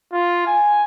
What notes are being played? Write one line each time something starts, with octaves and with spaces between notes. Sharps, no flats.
F4
G#5